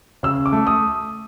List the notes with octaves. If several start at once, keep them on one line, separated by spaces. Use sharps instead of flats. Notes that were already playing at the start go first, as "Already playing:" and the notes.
C#3 E6
D6
A3
D#6